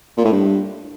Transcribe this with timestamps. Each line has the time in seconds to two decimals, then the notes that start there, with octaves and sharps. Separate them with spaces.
0.17 A#2
0.25 A2
0.32 G2